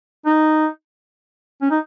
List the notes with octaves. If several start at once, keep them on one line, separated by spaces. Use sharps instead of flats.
D#4
C#4
D#4